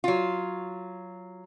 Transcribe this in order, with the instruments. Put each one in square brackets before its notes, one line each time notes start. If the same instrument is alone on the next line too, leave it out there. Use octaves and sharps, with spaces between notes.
[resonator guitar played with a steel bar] F#3 F4